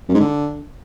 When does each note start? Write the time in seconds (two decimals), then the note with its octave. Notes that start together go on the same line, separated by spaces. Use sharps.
0.09 F#2
0.14 G#2
0.20 D3